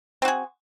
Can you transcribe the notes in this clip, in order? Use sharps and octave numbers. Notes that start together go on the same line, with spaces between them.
C4 F#4 G#4